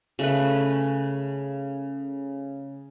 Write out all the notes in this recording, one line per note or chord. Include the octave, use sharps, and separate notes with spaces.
C#3 A3 B4